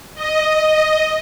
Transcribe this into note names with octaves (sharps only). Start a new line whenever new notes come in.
D#5